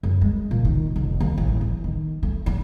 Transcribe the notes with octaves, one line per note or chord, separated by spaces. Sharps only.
F#2
G#3
A#2
D#3
F1
D#2
A1
E3
D#3
A3
D4